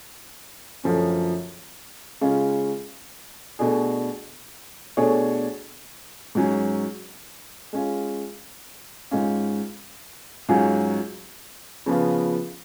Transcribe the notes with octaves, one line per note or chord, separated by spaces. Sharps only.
F#2 D3 F3 A3 C#4
C#3 G#3 C#4 F4
B2 A3 D4 G#4
B2 A3 D4 G#4 C#5
G#2 F#3 C#4
G#3 C#4 F4
G#2 G#3 C#4 F4
G#2 F#3 C#4 F4 G#4
C#3 F3 B3 F4